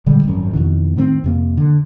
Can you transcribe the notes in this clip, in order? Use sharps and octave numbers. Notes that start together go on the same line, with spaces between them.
A#2 D3 G3 G#3
G#1 F#2
F2 B2 D#3 E3
A2 D#3 B3 C4
F2 C3 A#3
D3